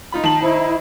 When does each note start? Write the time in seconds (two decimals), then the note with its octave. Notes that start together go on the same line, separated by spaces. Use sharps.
0.12 D#4 F4 B5
0.24 D#3 A5 F#7
0.42 D#4 E4 C5